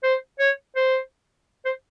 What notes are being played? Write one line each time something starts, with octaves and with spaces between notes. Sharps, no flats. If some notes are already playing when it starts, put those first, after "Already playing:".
C5
C#5
C5
C5